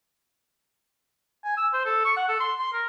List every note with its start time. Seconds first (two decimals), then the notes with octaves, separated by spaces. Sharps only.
1.45 G#5
1.57 E6
1.73 C5
1.85 A4
2.05 C#6
2.17 F#5
2.28 A4
2.40 C6
2.59 C6
2.72 A#4